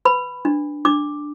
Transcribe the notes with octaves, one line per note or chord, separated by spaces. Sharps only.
B4 B5
D4
D4 D6